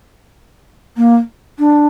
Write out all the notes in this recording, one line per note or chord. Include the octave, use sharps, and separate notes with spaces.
A#3
D4